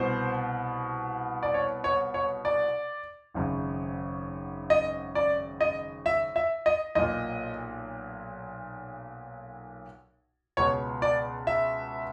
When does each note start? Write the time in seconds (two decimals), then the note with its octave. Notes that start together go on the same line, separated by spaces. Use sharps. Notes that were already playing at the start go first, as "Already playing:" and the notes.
Already playing: C2 B2 C5
1.43 D5
1.54 C#5
1.84 C#5
2.14 C#5
2.45 D5
3.34 G#1 F#2 C#3
4.70 D#5
5.15 D5
5.61 D#5
6.06 E5
6.36 E5
6.66 D#5
6.95 B1 A#2 D#5
10.57 C#2 B2 C#5
11.02 D5
11.47 E5